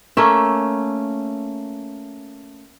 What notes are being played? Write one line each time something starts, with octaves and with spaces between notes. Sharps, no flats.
A3 A#3 C#4 E5